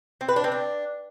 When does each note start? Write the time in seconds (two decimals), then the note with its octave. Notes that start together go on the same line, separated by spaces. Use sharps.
0.21 C4
0.29 B4
0.36 D4
0.44 C4
0.52 D4